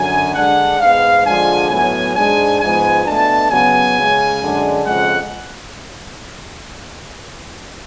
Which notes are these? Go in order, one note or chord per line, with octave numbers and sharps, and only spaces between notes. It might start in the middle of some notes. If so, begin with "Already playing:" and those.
Already playing: F#2 D3 F#3 G#5
D3 G#3 D4 F#5
G#2 G#3 B3 F5
D3 F3 G#3 D4 G#5
A2 F#3 B3 G#5
G#2 G#3 D4 G#5
G#2 F3 G#3 B3 G#5
B2 A3 D4 A5
C#3 F#3 B3 G#5
C#3 G#3 C#4
F#2 D3 G#3 D4
F2 C#3 G#3 F#5